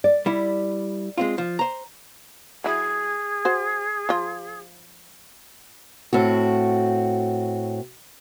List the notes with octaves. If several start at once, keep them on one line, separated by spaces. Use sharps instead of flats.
D5
G3 E4
G#3 C4 F4
F3
C5 A#5
F#3 E4 G#4
F#4 C5
F3 F4
A2 C4 F#4